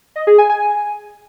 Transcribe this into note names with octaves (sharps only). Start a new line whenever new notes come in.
D#5
G#4
G#5
G#5